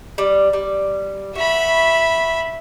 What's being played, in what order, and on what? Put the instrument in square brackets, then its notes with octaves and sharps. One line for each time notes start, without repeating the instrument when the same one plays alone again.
[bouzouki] G3
G3
[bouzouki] F#4 [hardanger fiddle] E5 B5